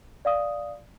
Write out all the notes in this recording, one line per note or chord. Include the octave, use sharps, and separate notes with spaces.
D5 F5 D#6